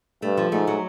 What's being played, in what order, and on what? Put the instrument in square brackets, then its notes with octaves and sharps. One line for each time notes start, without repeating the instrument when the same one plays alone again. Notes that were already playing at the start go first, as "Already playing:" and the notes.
[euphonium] G2 [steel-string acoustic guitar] A3
[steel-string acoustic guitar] F3
[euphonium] G#2 [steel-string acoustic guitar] A3
[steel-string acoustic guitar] F#3